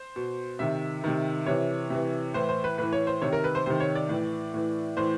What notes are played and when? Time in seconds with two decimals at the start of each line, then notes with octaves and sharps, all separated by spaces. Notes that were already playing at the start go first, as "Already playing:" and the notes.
Already playing: C5
0.16 B2
0.59 C3 D#3 E5
1.04 C3 D#3
1.46 C3 E3 C#5
1.90 C3 E3
2.34 A2 E3 C5
2.49 C5
2.64 B4
2.78 A2 E3 B4
2.93 C#5
3.07 C5
3.21 C3 D#3 C#5
3.33 A#4
3.44 B4
3.55 C5
3.66 C3 D#3 C5
3.80 C#5
3.95 D5
4.09 A2 E3
4.54 A2 E3
4.97 A2 E3 C5